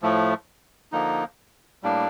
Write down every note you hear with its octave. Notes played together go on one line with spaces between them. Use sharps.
A2 F3 A3
D3 F3 A#3 D#4
A2 G3 A#3 D4